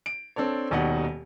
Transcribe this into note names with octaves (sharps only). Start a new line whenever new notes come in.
D7
C4 D4 A4 C#5
D#1 D#2 B2 D#4 D5 F#5